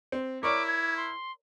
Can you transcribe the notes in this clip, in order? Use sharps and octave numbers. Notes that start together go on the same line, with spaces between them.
C4
E4 A#4 C#5 D5 D6
G#6
C6